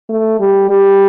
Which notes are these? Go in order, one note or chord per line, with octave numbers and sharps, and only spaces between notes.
A3
G3
G3